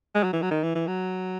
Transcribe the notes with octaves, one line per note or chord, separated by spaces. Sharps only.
G#3
F#3
E3
F#3
D#3
E3
E3
F#3